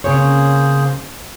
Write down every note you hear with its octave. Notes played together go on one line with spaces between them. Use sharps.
C#3 A#3 C4 G#4 C5 C#5